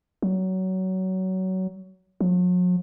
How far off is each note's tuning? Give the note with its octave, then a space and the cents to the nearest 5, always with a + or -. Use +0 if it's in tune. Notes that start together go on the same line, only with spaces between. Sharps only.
F#3 +20
F#3 -45